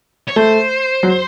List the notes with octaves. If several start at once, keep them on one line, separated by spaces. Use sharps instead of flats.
C#5
A3 C5
F#3